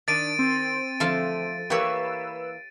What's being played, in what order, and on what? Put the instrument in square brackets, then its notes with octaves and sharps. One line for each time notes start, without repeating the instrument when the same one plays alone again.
[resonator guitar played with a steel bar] D#3 [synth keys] D4 [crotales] A6 D7 D#7
[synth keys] C4
[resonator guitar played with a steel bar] D3 A3 [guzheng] F3 F4 A4
[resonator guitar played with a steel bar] E3 A#3 [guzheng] G4 C#5 [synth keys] B4 E6